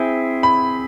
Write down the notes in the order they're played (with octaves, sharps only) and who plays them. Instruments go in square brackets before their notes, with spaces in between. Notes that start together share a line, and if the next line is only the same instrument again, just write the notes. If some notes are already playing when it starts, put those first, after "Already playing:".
Already playing: [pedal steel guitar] C4 E4 G#4
[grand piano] B5